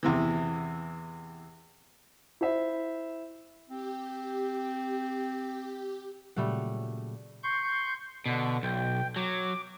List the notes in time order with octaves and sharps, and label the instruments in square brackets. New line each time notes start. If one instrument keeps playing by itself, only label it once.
[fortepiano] E2 C3 E3
[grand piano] E4 C5 E5
[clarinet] C4 [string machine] G4
[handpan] A#2 C#3 F#3 [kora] G3 A3 F#5
[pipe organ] C6 C#6 G6
[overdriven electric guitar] B2 [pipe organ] D3
[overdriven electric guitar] B1 [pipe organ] G5
[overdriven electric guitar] F#3 [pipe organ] D6